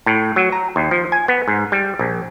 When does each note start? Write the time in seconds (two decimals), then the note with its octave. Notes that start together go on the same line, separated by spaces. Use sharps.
0.06 A2
0.36 F#3
0.52 A#5
0.76 D#2
0.91 F3
1.12 G#5
1.28 B3
1.48 G#2
1.72 G3
1.99 A#1